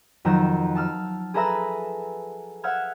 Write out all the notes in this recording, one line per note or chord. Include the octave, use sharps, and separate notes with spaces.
F2 D#3 F#3 A#5 E6 G6
A5 E6 F6
G#4 A4 B4 E5 A#5 E6
E5 F#5 E6 F6 G#6